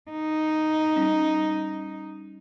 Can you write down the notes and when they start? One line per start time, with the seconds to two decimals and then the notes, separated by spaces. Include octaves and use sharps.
0.11 D#4
0.96 G3 C#4